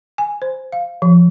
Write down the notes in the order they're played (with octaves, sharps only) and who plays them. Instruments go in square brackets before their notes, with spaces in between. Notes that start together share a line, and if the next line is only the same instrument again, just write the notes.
[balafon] G#5
C5
F5
F3